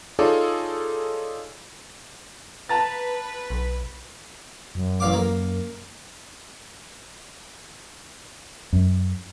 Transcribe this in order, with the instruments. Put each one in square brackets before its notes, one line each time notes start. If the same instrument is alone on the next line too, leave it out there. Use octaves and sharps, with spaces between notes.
[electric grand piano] D#4 F4 G#4 A4 C#5 D5
[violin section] B4 [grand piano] A5 A#5 A6
[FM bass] B1
F#2
[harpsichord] A1 F5 D6
A#3
[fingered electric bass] F#2